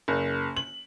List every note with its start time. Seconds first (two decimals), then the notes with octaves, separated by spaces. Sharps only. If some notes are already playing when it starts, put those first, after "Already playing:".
0.08 F#1
0.57 F#7